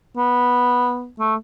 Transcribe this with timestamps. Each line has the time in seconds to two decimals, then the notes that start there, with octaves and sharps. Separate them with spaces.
0.17 B3
1.19 A3